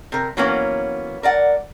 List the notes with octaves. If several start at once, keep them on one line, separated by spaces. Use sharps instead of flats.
C3 A#4
E3 F#3 A#3 B3 C#4
A#4 D5 F#5